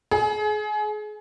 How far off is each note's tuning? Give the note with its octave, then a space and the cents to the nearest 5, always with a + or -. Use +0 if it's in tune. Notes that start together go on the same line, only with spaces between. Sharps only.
G#4 +30